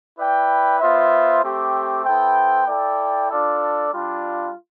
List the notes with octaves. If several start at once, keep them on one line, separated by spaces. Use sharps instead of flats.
E4 B4 D5 G5
B3 F4 C5 E5
A3 C4 G4
B3 E4 A4 C5 G5
E4 A4 D5 G5
D4 F4 A4 D5
G3 D4 F4